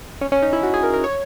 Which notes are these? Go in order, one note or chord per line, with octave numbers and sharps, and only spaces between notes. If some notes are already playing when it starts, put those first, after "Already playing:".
C#4
C#4
D#4
E4
F#4
G#4
A#4
A#4
C#5